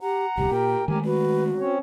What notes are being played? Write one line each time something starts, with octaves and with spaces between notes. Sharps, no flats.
G4 F#5 A#5
D1 C2 G4
A#2 A#4 G5
D#3 G#3 A3 G4 A#4 G#5
F#4 B4
C4 C#4 C#5